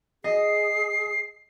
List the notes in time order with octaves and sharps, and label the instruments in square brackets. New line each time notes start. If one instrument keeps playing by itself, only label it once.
[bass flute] G#4 [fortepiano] D#5 [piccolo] C7